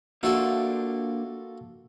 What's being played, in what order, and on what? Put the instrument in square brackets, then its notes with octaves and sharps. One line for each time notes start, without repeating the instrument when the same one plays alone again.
[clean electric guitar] A#3 D4 E5 [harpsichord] F4 F#4 A4